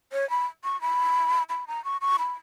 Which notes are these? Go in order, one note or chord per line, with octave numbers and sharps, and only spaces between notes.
C#5
B5
C#6
B5
B5
A#5
C#6
C#6
B5